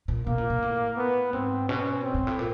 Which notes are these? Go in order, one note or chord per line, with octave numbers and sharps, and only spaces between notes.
A#2
B2 A#3
A#2
A#2
A2
B3
G#2 C4
B2 C#4
C4
G#2
A2
A#2